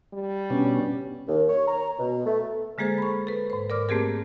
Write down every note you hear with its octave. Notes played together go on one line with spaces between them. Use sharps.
G3
B2 C#4 D4
D#2
C#5
A#5
B2
A3
D3 G#3 A#3 G#4 A4 C5
B5 C#6
A4 B4
G#2 C5
A#4 D5 D6 F6
A3 A#3 C4 G4 G#4 A#4